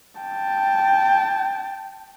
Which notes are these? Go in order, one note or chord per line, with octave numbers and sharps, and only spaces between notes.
G5 A5